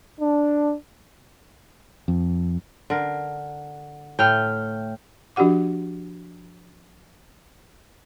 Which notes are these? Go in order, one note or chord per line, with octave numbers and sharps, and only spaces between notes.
D4
F2
D3 A#4
A2 A3 G5 F6
F3 D4 F#4 G4 F#5 D6